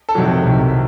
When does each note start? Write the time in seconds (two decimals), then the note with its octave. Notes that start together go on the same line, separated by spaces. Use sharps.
0.09 A4
0.15 F2 C3 D#3 F#3 F#4
0.45 C2 C3 D#3